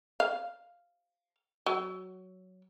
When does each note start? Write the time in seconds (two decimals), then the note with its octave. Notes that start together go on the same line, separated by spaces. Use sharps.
0.20 F5
1.66 F#3